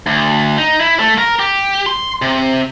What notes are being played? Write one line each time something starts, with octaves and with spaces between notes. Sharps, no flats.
D2
D#4
E4
A3
A#4
G4
C6
C3